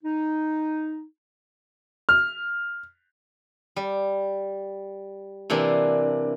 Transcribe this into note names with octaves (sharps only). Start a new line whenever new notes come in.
D#4
F6
G3
C3 E3 A#3 D4